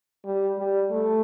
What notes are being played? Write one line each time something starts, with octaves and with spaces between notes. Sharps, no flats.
G3
G3
A3